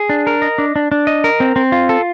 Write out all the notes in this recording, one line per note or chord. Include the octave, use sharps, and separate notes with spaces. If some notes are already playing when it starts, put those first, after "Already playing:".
Already playing: G#4
D4
A#4
D#5
D4
D4
D4
D#5
A#4
C4
C4
F4
A4